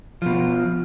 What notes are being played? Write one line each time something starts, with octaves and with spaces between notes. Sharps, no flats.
B2 F3